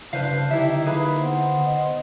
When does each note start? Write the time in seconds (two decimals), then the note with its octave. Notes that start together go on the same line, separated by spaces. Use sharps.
0.13 G2 C#3 D4 B4 C5 F5
0.50 D3 D#4 E4 G4 E5
0.85 A#3 D#4 E4 G#4 B4 B5
1.20 B3 C5
1.67 D#5